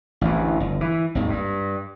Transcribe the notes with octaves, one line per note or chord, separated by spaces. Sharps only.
A1 D2 E3
G1
E3
G#1 D#2
G2